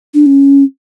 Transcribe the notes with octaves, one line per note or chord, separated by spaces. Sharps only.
D4
C#4